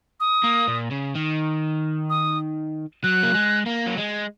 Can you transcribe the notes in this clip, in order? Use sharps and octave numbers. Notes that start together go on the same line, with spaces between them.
D#6
A#3
A#2
C#3
D#3
D#6
F#3 F#6
A#3
G#3
A#3
F#3
G#3